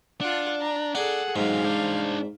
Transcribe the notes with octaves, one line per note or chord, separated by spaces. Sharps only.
D4 F4 F#5
A#5
D4 G#4 A4 F#5
G#2 F#3 G#3 F5
D4 C5